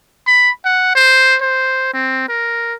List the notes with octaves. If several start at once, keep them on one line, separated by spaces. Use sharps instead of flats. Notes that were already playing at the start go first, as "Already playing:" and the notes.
B5
F#5
C5
C5
C4
A#4